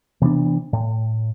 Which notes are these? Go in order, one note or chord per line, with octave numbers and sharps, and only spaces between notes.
C3 E3 B3 D4
A2